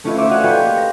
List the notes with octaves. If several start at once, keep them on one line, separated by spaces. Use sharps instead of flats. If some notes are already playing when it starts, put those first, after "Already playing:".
A3 C#4 E4 F4 B4 D#5
C5 C#5 E5 D6 E7
F#4 D5 D#5 F5 G#5 F#6
F4 A4 B4 C#5 G5 C6
A#3 G4
A#6